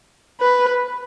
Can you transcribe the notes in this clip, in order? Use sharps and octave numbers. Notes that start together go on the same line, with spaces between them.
B4